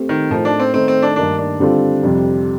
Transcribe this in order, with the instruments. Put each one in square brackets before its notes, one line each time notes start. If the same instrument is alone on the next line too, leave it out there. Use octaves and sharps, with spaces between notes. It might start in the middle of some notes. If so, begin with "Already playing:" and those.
Already playing: [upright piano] A3 C4 G4
[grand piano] D#3
[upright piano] A2 A3 D#4 A#4 [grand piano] F3
[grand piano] D4
C4
[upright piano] D#3 A3 D#4 [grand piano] C4
[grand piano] C4
D4
[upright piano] G2 D#3 A#3 D#4 [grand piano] D4
[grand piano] D4
[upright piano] D3 G3 C4 F4 A4
F2 C3 G3